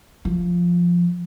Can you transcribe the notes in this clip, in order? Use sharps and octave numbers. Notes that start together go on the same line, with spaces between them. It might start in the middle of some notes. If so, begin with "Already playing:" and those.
F3